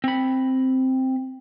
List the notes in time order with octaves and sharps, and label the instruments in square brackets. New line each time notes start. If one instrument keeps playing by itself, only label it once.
[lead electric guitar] C4 B5